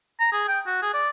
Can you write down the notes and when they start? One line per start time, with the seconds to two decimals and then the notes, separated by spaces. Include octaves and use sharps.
0.20 A#5
0.32 G#4
0.48 G5
0.66 F#4
0.82 G#4
0.94 D5